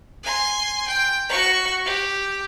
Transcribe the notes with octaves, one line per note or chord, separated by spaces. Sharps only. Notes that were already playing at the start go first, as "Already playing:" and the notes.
G#5 C6
G5
F#4 C#6
G4